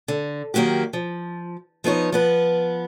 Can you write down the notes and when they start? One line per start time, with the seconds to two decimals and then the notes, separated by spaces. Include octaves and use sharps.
0.08 D3
0.54 D#3 F#3 A#3 F#4 G4
0.93 F3
1.84 F3 B3 D#4 C#5
2.12 F3 B3 B4